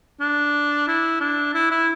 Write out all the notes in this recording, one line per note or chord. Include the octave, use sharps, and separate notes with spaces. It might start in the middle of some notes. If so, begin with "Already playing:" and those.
D4
E4
D4
E4
E4